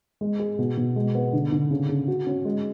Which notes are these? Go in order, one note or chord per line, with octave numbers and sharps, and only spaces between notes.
G#3
G#4
B2
B2
G#3
B3
D3
D3
C#3
C#3
F#4
C#4
G#3